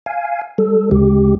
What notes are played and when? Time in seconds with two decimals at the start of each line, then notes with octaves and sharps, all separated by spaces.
0.06 F5 G#5
0.58 G3 A4
0.91 D2 C#3 G#3 G4